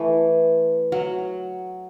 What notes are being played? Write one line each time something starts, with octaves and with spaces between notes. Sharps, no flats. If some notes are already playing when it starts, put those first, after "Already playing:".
Already playing: E3 A3
F#3